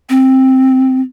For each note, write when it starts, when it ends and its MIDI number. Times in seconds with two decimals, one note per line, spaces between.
0.10 1.00 60